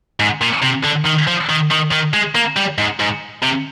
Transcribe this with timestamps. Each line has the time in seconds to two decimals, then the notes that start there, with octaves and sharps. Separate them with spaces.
0.20 G#2
0.42 A#2
0.63 C3
0.84 D3
1.06 D#3
1.27 F3
1.49 D#3
1.71 D#3
1.92 D#3
2.14 G#3
2.35 A#3
2.56 G3
2.78 G#2
3.00 G#2
3.43 C3